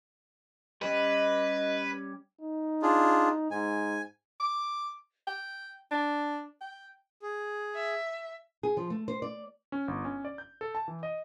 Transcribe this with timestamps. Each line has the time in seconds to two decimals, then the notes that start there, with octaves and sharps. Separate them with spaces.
0.82 G3 C#4 G4 B4 D#5
2.41 D#4
2.82 D4 F4 G#4
3.51 G#2 G#5
4.40 D6
5.27 G5
5.91 D4
6.61 G5
7.22 G#4
7.75 E5
8.63 G#4
8.77 F3
8.90 A3
9.08 C5
9.22 D5
9.72 C#4
9.88 G1
10.05 C#4
10.25 D5
10.38 G6
10.61 A4
10.75 A5
10.88 E3
11.03 D#5